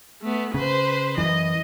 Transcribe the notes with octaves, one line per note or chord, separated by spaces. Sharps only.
A3 B3
C#3 B4 C5
F#2 E3 D#5